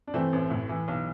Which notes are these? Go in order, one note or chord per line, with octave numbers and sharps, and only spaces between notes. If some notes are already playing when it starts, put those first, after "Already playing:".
D4
E3 A3 C4
A1
A2
E3
B1